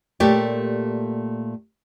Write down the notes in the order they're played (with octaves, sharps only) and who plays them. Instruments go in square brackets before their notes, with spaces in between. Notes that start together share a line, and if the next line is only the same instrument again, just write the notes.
[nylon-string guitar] A#2 A3 G4 C#5 D5